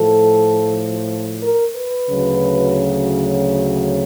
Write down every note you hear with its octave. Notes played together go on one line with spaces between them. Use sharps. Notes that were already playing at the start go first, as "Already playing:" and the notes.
Already playing: A2 F3 A4
A#4
B4
D2 C#3 F#3